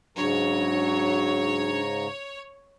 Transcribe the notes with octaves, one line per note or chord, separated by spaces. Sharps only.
G#2 C#3 F#3 D4 C#5 A#5